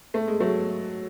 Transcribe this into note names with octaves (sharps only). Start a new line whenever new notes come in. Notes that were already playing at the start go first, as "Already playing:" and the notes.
A3
G#3
F#3 A3